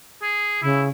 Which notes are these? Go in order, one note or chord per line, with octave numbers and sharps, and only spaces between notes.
G#4
C#3 E4